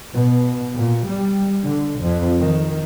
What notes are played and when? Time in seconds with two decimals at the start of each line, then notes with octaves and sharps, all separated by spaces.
0.12 B2
0.75 A#2
1.05 G3
1.61 D3
1.99 F2
2.39 D#3